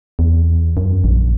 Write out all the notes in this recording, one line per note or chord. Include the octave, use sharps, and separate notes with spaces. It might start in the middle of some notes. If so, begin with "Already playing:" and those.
E2
F#2
A#1